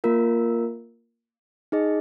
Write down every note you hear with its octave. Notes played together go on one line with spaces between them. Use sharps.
A#3 F4 A#4
D#4 G#4 D#5